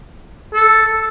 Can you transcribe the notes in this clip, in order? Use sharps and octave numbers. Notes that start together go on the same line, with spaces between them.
A4